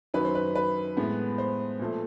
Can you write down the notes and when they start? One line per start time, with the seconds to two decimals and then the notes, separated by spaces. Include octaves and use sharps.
0.14 F#2 D#3 F#3 B4
0.25 C5
0.35 B4
0.55 B4
0.97 A2 E3 G#3 B3
1.38 C5
1.79 A#2 F3 A3